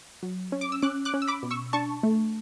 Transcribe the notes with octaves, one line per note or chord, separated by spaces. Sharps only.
F#3
C#4
D6
E6
C#4 D6 F#6
D6 F#6
C#4
E6
B5 D6
B2
C#6 E6
D4 A5 C#6
A3